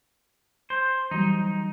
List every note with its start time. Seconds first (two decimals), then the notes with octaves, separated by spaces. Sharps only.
0.70 C5
1.11 E3 F#3 G3 D#4